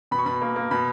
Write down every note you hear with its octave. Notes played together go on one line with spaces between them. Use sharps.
B2 B5
C#6
B2 B5
A#3
A#3
B2 B5